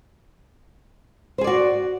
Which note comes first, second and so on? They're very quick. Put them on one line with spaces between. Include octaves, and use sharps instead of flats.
C5 G#4 D5 F#4